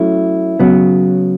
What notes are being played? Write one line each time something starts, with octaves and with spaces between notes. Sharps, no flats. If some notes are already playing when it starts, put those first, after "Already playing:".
Already playing: F#3 A3 C#4 E4
C#3 F#3 B3